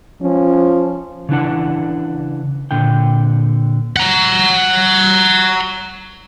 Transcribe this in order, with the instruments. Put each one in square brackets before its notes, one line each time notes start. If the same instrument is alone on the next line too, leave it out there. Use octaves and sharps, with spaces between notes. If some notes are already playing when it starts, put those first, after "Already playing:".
[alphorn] F3 [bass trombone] C#4
[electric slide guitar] C#3 E3 D4 F#5
A#2 D3 G5
[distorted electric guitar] F#5 A#5